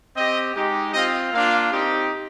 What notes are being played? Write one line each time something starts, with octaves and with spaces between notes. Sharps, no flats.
C4 G4 D#5
G#3 D#4 G4
C4 F4 D#5
A#3 D4 F4 F5
C4 D#4 G4